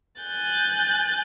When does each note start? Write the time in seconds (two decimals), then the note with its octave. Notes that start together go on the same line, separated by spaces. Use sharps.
0.20 G#5 F#6 G6 A6